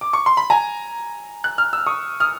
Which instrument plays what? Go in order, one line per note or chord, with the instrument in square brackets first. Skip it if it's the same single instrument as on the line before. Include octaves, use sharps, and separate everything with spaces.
[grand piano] D6
C#6
C6
B5
G#5 A#5
F#6
F6
E6
C#6 D#6
D#6 F6